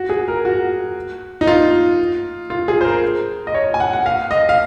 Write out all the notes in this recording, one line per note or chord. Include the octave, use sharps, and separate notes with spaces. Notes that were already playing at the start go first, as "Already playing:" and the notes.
Already playing: F#4
G#4
A#4
F#4
D#4
F4
F4
G#4
C5
A#4
D#5
C#5
G#5
F#5
F#5
F5
D#5
F5